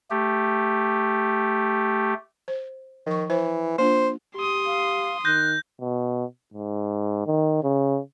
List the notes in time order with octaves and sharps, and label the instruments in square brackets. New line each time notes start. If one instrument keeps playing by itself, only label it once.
[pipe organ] A3 G4
[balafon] C5
[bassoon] D#3 [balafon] F3 C#6
[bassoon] E3 [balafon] C5
[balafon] A#3 D4 F4 [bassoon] C5
[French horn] G4 [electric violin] C6 D#6
[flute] F5
[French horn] D#3 [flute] F#6 [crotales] G6 A#6
[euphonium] B2
G#2
D#3
C#3